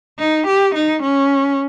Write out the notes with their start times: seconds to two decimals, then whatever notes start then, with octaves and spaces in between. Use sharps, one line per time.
0.19 D#4
0.47 G4
0.75 D#4
1.03 C#4